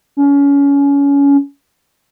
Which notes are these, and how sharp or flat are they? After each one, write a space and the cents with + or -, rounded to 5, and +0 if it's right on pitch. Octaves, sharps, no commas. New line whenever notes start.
C#4 +25